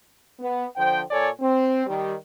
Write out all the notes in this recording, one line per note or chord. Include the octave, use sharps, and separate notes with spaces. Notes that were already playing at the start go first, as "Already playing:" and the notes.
B3
D3 F3 C5 G5
A#2 A4 C#5 D5 G#5
C4
D#3 G3